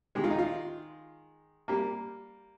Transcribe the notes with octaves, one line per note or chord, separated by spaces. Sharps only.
D#3 G#3 G4
F4
D#4
F4
G3 A#3 G4